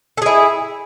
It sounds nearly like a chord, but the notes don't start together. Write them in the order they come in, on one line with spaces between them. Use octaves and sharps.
A4 G#4 E4